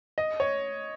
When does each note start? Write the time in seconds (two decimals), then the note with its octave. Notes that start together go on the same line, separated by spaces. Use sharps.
0.18 D#5
0.40 C#5